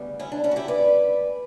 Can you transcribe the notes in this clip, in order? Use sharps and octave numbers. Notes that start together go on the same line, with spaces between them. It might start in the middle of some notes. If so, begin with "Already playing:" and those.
Already playing: D2 C#3 G3 B3
C#4 E4
D4
C#4 E4
F#4
E4 G4
B4 D5